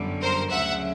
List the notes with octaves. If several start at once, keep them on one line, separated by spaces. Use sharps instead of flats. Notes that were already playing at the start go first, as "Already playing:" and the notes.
Already playing: G1 F#2 D3 G3
A#4 C5
D2 C#3 F#3 E5 F#5